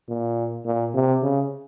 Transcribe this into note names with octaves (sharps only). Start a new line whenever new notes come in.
A#2
A#2
C3
C#3